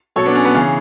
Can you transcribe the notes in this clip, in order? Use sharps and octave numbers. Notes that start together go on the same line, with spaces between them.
B2 F#3 A4 C#5
B3 D4
C#4
B3
C#3 E3 C#4